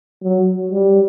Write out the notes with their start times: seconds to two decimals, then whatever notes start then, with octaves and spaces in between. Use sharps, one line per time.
0.23 F#3
0.71 G3